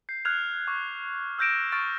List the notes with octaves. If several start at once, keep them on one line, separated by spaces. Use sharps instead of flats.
G6 C7
F6 F#6 G#6 F7
C#6 D6
E6 F6 G6 A#6 D7 E7
C#6 F6 A6 D7